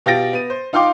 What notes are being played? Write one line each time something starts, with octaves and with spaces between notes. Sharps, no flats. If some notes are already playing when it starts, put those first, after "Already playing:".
B2 F4 G4 A6 A#6 D7
B3 D#7
C5
D#4 F4 F5 G5 C6 D6